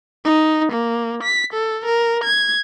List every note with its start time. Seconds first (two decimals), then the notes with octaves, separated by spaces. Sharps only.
0.25 D#4
0.72 A#3
1.23 B6
1.53 A4
1.86 A#4
2.24 G#6